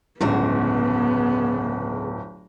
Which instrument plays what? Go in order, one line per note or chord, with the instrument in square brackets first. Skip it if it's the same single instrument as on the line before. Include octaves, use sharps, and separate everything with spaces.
[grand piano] D1 G1 [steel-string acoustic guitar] C#3 G#3 F#4 [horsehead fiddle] B3